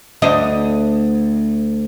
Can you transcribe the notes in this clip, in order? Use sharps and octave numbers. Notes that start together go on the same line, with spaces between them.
D2 D4 D#5